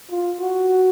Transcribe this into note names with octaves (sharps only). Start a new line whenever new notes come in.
F4
F#4